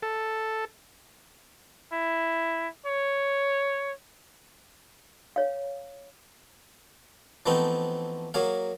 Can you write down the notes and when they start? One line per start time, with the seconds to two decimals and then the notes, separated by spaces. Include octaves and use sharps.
0.02 A4
1.93 E4
2.86 C#5
5.36 C#5 F5
7.46 E3 F3 A3 B3 C4 D#4
8.34 F#3 A#3 G#4 F5